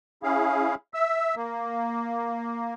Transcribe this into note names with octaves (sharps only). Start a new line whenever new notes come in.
C#4 E4 G#4 F5
E5 E6
A#3